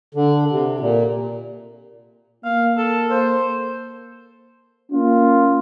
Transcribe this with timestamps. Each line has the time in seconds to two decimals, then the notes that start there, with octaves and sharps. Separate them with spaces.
0.15 D3
0.51 C3
0.80 A#2
2.45 A#3 F5
2.78 A4
3.10 C5
4.92 A#3 C#4 F4